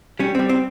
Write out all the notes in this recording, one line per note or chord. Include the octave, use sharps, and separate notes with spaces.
G3 C#4
G3 C4
C4